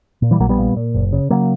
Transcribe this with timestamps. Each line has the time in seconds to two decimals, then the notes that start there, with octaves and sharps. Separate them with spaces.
0.22 A#2
0.31 E3 G3
0.40 A#1 F#3 A#3
0.49 G3 B3
0.58 A#2
0.76 A#2
0.94 F#1
1.13 C#3
1.30 C#3 F#3 A#3